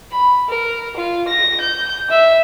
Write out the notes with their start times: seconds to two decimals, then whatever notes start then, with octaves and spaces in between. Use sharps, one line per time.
0.11 B5
0.48 A#4
0.96 F4
1.28 A#6
1.60 G6
2.10 E5